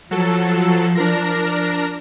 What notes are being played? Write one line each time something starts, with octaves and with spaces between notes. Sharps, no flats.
F3 F#3 A4
D4 A#4 A#6